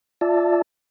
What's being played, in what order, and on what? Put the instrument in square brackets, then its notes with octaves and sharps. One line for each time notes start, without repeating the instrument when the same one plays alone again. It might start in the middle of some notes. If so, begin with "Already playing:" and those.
[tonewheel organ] F4 D5 E5 A5